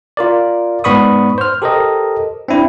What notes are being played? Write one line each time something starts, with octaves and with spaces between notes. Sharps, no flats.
F4 A#4 D5
G#2 B3 D5 B5 C#6 D#6
C5 F6
G4 A4 A#4 C5 D#5
C4 D4 E4